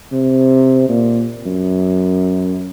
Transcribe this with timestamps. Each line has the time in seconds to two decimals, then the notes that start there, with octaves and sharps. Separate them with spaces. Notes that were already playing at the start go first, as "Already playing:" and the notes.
0.12 C3
0.89 A#2
1.46 F#2